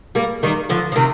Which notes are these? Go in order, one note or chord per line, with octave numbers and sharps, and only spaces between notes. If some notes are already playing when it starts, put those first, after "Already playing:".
G3 A#3
D#3 G3
D3 F3
F3
C3 D#3